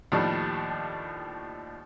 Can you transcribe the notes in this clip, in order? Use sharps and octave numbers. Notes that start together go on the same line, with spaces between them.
D#2 A2 F3 G3 D4